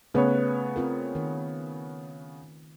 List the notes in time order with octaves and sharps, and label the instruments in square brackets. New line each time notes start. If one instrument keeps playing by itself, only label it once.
[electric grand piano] C#3 B3 C#5 [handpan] A3 B4
[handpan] C4 F4 A#4
D#3